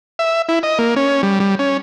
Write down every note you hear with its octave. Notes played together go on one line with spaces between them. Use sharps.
E5
E4
D#5
A#3
C#4
G3
G3
C#4